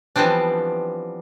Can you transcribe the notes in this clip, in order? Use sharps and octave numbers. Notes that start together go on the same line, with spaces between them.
E3 F3 G3 B3 C4 D4